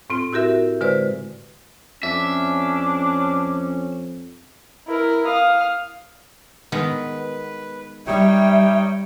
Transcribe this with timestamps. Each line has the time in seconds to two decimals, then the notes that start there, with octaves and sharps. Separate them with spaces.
0.10 A2 C4 F4
0.33 E4 F#4 G4 A#4 E5
0.81 D3 G#3 B4 C5 D5
2.03 F2 C#4 D4 E5
4.88 E4 A#4
5.27 F5 D#6
6.72 D#3 G#3 B3 B4
8.07 G3 D#4 C#5 E5 G5